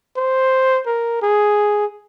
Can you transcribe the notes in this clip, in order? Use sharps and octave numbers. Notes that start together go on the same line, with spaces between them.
C5
A#4
G#4